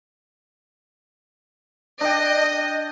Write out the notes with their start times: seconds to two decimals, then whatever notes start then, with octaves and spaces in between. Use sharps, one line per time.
2.01 D4 D#5 G5